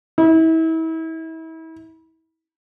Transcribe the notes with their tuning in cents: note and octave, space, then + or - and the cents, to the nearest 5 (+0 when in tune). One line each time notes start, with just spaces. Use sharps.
E4 -35